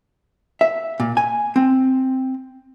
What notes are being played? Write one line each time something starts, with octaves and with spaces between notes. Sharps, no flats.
E5
A#2
G#5
C4